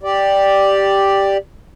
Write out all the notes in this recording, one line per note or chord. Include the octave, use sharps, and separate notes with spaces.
G4 D5